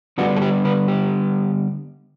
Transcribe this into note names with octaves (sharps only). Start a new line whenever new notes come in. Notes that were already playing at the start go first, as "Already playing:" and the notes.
D3 G3 B3 D4 F#4
A4
G4
B4
G4